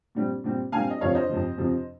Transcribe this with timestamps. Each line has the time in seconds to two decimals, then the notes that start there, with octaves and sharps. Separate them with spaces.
0.15 A#2 G3 C4
0.44 A#2 G3 C4
0.72 A#2 G3 C4 F5 G#5
0.90 D#5
1.01 F2 C3 F3 C#5 F5
1.15 C5 D#5
1.29 F2 C3 F3
1.58 F2 C3 F3